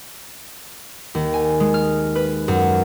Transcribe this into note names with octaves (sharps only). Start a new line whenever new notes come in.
D#2
G#5
G#3
F6
B4
F#2